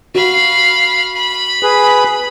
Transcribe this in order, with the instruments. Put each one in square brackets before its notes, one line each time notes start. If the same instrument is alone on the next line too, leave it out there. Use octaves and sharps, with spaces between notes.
[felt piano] F#4 [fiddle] F5 B5
[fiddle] B5
[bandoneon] G#4 B4